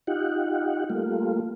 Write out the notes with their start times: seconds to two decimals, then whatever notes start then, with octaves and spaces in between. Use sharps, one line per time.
0.07 D#4 F4 G4 F#5
0.90 G3 A3 A#3 F4